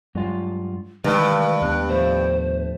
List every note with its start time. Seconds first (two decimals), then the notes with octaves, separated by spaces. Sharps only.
0.15 G2 F#3 G#3 F4
1.04 G2 C3 D#3 E3 G#3 A3 B4
1.62 D#2 B3 D4 F#6
1.89 A2 F3 A3 C5